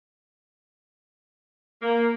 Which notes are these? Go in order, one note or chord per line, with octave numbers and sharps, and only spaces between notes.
A#3